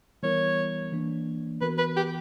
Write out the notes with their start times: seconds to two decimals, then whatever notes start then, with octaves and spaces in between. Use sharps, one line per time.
0.23 E3 G3 B3 E4 A#4 C#5
0.92 E3 A#3 D4
1.61 E3 B3 F#4 A#4 B4
1.78 B4
1.96 G4